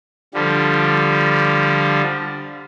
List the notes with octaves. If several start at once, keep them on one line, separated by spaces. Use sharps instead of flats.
D3 F3 G3